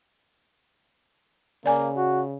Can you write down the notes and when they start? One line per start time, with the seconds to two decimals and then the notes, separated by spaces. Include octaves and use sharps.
1.66 C#3 A#3 D5 G#5
1.96 F#4